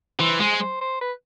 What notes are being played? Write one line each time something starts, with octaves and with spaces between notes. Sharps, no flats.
E3 C5
G#3 C5
C5
C5
B4